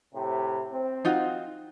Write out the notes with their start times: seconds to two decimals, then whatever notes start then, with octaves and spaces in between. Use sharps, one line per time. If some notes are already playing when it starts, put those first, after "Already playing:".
0.15 A2 C3
0.73 C4
1.05 D#4 F4 F#4